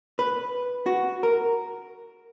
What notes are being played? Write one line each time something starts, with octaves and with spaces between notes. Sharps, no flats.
B4
F#4
A#4